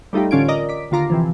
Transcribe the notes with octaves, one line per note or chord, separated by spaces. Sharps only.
G3 A3 D#4 F4 G4
A1 D3 C#4 F4 G#6 D7
A#4 D5 D#5 A#5
D6 B6
D#2 D3 F4 A#5 D6 C7
C3 E3 F3